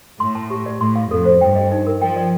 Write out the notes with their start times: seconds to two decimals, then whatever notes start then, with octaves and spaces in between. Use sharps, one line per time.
0.20 A2 C6
0.35 A5
0.50 G4
0.66 D5
0.81 A2 C6
0.96 F5
1.11 F2 A4
1.25 C5
1.41 G2 G5
1.55 D#5
1.72 D#4
1.87 A#4
2.01 F3 G5
2.16 D5